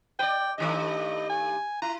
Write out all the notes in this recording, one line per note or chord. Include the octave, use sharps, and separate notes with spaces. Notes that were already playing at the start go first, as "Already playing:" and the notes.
B4 D5 G5
G2 D#3 A3 D#5
G#5
E4 A#5